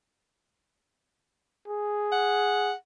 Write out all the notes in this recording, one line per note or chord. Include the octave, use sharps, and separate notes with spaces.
G#4
F#5